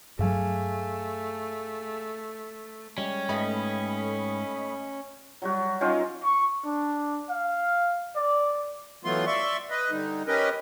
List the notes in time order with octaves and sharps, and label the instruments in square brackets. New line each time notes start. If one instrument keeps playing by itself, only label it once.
[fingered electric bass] G2 F#3 [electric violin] A3 [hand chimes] G#4 F5 G#5
[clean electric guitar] G3 G#3 [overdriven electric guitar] C#4
[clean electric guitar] G#2 G4 B4 [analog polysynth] A3 D#5 B5
[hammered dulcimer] F#3 G3 F#4
F#3 C#4 D#4 F4
[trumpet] C#6
D4
F5
D5
[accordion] E3 F#3 A3 B3 F4 C6
D5 E5 C6 C#6
B4 D#5
D3 G3 D#4
C#4 G4 A#4 B4 D#5